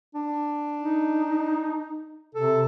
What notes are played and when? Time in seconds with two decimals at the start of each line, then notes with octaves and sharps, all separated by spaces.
0.15 D4
0.80 D#4
2.35 C3 A4